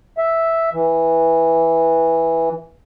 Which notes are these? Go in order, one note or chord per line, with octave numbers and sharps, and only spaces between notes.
E5
E3